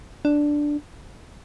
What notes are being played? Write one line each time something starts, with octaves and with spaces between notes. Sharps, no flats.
D4